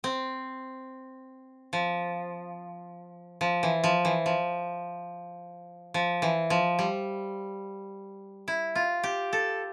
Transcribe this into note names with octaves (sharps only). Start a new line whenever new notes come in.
C4
F3
F3
E3
F3
E3
F3
F3
E3
F3
G3
E4
F4
G4
A4